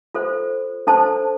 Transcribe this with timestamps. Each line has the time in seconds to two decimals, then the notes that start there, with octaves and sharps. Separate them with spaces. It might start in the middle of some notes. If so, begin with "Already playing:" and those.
0.14 F4 A4 C5
0.87 D4 A4 C5 A5